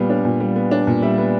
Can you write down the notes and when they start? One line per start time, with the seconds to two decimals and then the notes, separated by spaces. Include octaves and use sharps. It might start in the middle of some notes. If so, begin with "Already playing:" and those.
Already playing: A#2 G3 B3 F5
0.10 D4
0.25 A#2
0.40 G3
0.56 B3
0.71 D4
0.87 A#2
1.02 G3 E5
1.18 B3